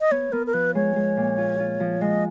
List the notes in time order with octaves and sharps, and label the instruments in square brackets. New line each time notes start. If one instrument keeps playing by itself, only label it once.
[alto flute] D#5
[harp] B3 [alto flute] C#5
[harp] B3 [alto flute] A#4
[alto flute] A#4
[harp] F3 [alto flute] B4
[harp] G#3 [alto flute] C#5
[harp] G#3
A#2
F4
F4
F3
[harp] G#3 [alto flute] D#5